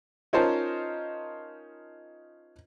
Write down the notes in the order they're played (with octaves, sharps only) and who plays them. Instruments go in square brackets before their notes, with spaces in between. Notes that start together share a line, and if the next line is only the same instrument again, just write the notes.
[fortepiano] C#4 D#4 F4 A#4 C5 A5